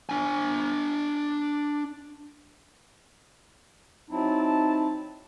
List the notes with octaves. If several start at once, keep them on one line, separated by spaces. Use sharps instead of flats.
D4 G#5
F#3 C4 D#4 E4 A5